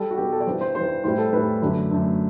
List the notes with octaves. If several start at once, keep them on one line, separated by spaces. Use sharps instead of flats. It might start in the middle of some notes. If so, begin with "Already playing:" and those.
Already playing: G3 A4
F#4
B2 G3 G4
A4
D5
G2 E3 G3 C5
C5
G2 E3 G3 C5
A2 E3 G3 C5
A4
A2 E3 G3 B4
F#2 D3 A3
F#2 D3 A3